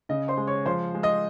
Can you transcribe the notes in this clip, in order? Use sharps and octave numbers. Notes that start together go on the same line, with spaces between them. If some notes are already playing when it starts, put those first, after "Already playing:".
C#3 D#5
C5 C6
G#3
C#5 C#6
F3 C5 C6
G#3
D#5 D#6